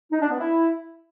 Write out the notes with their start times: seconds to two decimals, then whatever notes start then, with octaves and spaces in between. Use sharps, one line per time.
0.12 D#4
0.21 D4
0.30 B3
0.39 E4